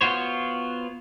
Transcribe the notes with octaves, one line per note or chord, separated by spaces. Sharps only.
B3 F4 F#4 C5 C#5